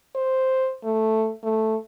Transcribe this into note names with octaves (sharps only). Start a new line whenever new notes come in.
C5
A3
A3